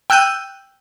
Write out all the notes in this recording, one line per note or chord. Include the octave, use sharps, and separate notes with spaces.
G5 E6 F#6 G6 D#7